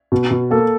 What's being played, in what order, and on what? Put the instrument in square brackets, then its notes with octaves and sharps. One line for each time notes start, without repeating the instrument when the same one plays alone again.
[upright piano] B2
B2
[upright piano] A#3 [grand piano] A4